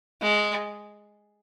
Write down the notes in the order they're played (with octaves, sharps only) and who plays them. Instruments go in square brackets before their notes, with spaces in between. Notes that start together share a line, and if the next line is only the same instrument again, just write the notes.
[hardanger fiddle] G#3